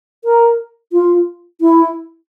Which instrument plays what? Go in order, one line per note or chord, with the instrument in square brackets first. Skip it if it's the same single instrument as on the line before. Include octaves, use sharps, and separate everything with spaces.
[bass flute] A#4
F4
E4